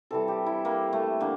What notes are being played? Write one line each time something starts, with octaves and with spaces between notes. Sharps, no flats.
C3 E3 G3 A4
G4
E4
A#3
A3
D3 A#3